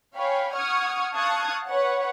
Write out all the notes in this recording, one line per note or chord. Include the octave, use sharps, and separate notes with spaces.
C#5 F5 G5 G#5 B5
F#5 C#6 D#6 F6 G#6
F5 A5 C#6 D#6 F#6 G#6
B4 C#5 F#5